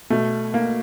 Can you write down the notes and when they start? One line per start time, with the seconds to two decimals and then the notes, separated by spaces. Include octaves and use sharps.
0.10 B2 A3
0.54 A#3